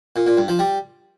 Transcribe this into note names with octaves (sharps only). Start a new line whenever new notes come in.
A#2
A#2
G2
F3
G3